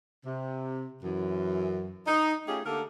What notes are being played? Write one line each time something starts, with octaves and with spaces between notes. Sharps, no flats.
C3
F#2 E3
D#4
A3 C#4 D#4 F4 G4 G#4
D3 A3 A#3 G4 A4 A#4